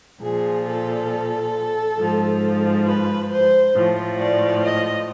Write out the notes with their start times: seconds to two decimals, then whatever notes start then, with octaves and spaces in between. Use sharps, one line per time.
0.22 A#2 F3 G#4
0.67 A4
1.99 G#2 F3
2.87 B4
3.31 C5
3.76 A2 F3
4.19 D5
4.64 D#5